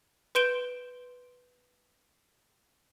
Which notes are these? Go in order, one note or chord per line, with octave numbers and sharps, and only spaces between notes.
B4 C6 G6 D7 E7 G7